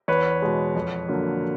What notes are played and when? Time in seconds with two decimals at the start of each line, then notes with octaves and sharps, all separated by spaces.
0.08 E2 B4 C#5
0.42 B2 G#3
0.75 F2
1.09 D3 F#3 A#3